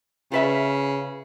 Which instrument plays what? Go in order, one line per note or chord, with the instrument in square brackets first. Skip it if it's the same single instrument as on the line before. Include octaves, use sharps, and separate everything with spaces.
[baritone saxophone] C#3 [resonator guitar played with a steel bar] F4 B4 E5